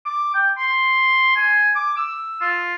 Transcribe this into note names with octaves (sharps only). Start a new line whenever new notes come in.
D6
G5
C6
G#5
D6
E6
F4